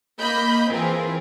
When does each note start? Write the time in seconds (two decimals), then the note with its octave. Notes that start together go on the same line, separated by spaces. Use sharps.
0.19 A#3 D#5 B5 G6
0.71 E3 C4 F4 G#4 A#4